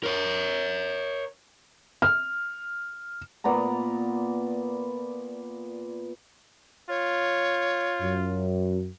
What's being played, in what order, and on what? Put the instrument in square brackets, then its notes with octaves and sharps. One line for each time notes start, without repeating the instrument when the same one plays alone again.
[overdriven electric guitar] A#4 C#5
[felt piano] F6
[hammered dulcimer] A#2 B3 D5 A#5
[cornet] F4 [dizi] C#5
[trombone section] F#2